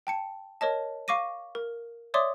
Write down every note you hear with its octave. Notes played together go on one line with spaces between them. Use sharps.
G5 A5 C#7
A#4 C#5 D#5 A5
F5 C#6 D6 A#6 D#7
A#4
C#5 D5 E5 C6 D6 D#6